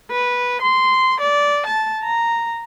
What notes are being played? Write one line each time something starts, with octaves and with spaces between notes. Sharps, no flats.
B4
C6
D5
A5
A#5